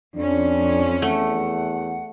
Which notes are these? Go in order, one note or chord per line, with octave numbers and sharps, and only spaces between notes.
F2 C#4 D4
E2 A3 F#5